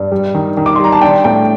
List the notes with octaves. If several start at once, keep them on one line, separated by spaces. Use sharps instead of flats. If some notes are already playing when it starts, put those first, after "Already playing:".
Already playing: G2
G3
D#3
D#3
D6
C6
G3 A#5
A5
D4 G5
A2 G5